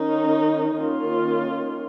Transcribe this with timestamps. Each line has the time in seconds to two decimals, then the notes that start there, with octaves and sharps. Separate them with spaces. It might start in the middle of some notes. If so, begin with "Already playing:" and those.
Already playing: D#3 C#4 D#4
0.77 D#3 A#3 C#4 F4